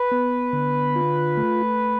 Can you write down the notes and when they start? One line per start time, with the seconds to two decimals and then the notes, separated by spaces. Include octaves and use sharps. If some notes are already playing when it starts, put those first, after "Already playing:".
Already playing: B4
0.12 B3
0.53 D3
0.96 F4
1.37 A3